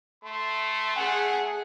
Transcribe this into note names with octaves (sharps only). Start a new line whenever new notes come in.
A3 C6
G#4 F#5